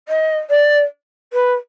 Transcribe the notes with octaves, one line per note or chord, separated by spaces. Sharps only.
D#5
D5
B4